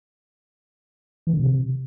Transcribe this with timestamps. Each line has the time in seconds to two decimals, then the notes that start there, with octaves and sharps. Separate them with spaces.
1.27 E3
1.33 D3
1.40 C3